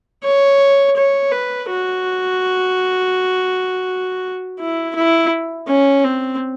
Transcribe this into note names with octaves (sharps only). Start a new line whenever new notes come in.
C#5
C#5
B4
F#4
E4
E4
C#4
C4